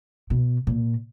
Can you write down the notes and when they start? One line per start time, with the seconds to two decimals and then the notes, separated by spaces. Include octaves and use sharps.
0.30 B2
0.67 A#2